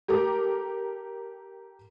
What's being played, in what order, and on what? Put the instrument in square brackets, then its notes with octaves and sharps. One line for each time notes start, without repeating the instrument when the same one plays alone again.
[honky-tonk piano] G4 A4 A#4 A#5 D6